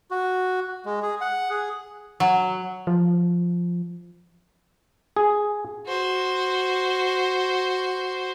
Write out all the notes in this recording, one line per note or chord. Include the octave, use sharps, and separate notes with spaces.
F#4
G#3
G#4
F#5
G#4
F#3
F3
G#4
F#4 C5